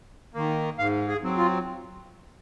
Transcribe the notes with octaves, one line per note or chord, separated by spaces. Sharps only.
D#3 A#3
G#2 F5
G#4
F#3 C4
F4